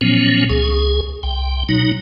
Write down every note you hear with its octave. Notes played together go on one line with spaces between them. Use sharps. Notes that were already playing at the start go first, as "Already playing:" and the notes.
A#2 F3 F#3 B3 C#4
C#2 G#4
C2 G5
B2 F#3 D#4